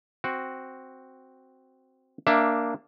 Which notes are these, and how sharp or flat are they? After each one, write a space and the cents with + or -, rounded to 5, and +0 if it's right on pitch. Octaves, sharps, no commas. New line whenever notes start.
C4 +0 F#4 +0
A#3 +0 D4 +0 E5 +15